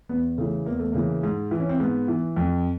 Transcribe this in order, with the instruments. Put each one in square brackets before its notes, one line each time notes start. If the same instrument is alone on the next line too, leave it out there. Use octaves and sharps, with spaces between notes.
[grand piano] E2 B3
C#3 E3 A3
E2 A#3
A3
C#3 E3 A#3
G#2
E3
C#4
C4
G#2 B3
E3
F2